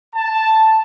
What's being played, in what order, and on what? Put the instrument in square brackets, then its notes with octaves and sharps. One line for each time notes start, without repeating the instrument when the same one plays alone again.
[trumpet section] A5